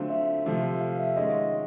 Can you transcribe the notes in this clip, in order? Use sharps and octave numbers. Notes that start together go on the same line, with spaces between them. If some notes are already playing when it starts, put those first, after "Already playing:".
Already playing: D3 F#3 A3 C4 F4
E5
C3 F3 A3
F5
E5
D#3 G#3 C#4 F4 D#5